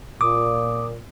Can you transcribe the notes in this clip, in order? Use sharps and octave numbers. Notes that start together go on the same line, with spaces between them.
A#2 D6 D#6